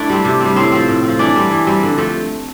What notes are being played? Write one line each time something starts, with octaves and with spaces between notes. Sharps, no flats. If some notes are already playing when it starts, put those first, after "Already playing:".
Already playing: A3 D4 E4 D5
G3 C4
C3
G3 C4
A2 C4 C5
F3 C4
A2
C4
F3
E3 D4 D5
G3 C4
E3
G3 C4
D3
F3 A3